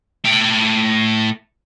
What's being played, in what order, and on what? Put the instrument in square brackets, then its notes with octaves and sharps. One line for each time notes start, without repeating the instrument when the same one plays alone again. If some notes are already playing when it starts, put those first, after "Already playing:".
[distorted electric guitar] A2 G5